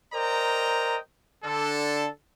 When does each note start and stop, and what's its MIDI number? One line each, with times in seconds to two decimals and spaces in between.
0.13 0.97 70
0.13 0.97 72
0.13 0.97 74
0.13 0.97 75
0.13 0.97 79
0.13 0.97 82
1.44 2.08 50
1.44 2.08 62
1.44 2.08 69